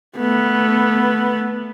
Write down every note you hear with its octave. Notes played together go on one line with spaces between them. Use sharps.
A3 B3